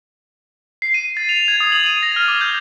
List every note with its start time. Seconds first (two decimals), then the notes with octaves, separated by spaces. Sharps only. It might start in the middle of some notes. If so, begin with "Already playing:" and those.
0.82 C7
0.94 D#7
1.17 A6
1.29 F7
1.48 G#6
1.60 D#6
1.72 F#7
1.86 D#7
2.03 A#6
2.16 F6
2.28 D6
2.41 G6